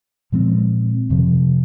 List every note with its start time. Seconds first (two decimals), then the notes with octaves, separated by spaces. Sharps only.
0.32 A#2 F3 G#3 C4
1.10 F2 C3 F3